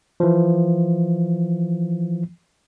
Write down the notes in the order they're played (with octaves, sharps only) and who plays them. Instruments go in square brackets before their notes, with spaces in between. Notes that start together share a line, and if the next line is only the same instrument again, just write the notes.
[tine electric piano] E3 F3